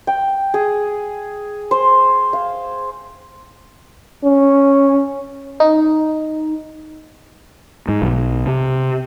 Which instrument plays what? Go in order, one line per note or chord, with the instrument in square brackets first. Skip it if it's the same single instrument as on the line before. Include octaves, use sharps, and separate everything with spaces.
[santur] G5
G#4
C5
F5
[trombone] C#4
[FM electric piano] D#4
[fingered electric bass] G#2
B1
C3